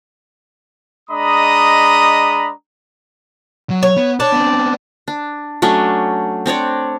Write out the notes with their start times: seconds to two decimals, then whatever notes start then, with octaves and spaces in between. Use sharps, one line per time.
1.10 G#3 D4 D#5 A#5 B5 D#6
3.70 F#3
3.83 C#5
3.97 B3
4.20 D4 C#5
4.32 B3 C4
5.08 D4
5.62 F#3 A3 C#4 D4
6.46 C4 D4 C#5 D5